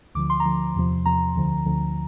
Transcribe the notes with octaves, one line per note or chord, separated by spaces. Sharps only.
D2 D3 F3 D6
C6
A#5
D2 D3 F3 C6
E2 C3 F3
E2 C3 F3 A#5
D2 D3 F3
D2 D3 F3